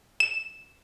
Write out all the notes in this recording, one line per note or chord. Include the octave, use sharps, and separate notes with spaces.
E7